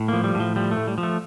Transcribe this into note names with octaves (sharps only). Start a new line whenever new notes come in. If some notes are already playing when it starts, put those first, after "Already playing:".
Already playing: A2
F3 A#3
G3
A2 F3
F3 G3
A3
A2
G3
F3
A3